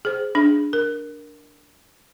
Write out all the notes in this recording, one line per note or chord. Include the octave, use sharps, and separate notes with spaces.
G#4 C5
D4 G#4
A#4